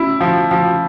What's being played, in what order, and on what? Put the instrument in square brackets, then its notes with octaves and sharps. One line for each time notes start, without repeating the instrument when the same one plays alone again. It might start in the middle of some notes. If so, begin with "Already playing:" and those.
Already playing: [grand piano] C#4 E4
F3
F3